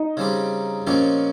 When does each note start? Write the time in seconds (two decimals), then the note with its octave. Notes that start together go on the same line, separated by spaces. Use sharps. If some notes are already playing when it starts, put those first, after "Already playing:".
Already playing: D#4 D#5
0.17 C#3 G3 C4 G4
0.87 A#2 F3 C4 C#4 D#4 G4 C#5